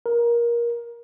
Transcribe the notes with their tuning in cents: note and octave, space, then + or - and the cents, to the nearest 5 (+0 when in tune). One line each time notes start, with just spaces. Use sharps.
A#4 +20